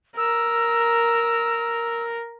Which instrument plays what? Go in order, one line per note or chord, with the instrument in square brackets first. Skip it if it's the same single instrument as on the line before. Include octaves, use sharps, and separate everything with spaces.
[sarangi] A#4 [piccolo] E6